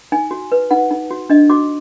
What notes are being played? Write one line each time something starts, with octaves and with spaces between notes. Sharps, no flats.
D#4 G#5
F#4
B4
D#4 F#5
D#4
F#4
D4 D#5
F#4 D6